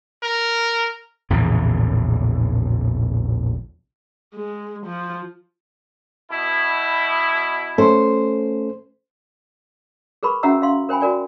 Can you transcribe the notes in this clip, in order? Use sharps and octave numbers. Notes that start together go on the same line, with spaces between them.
A#4
A#1 E2 A2 C#3
G#3
F3
B2 E4
A3 C#4 A4 C5
G#4 A#4 B4 B5 C#6
C#4 F#4 E5 F#5 A#5 E6
E5 F5 C6
A#4 C5 G5 G#5 B5
F#4 A#4 D5 G#5